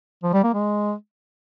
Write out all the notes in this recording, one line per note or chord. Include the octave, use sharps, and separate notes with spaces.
F3
G3
A#3
G#3